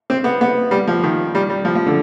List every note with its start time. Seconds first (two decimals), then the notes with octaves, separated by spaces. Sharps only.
0.10 C4
0.24 B3
0.41 B3
0.71 G3
0.88 F3
1.03 D#3
1.35 G3
1.50 G3
1.65 F3
1.75 F3
1.86 D3